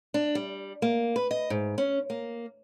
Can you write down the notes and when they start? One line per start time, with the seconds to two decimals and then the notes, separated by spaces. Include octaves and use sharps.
0.14 D4
0.35 G3
0.82 A#3
1.16 B4
1.31 D#5
1.50 G#2
1.78 C#4
2.10 A#3